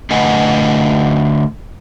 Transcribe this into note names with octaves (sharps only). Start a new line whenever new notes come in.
D3 A3 B4 D#5 F#5 G#5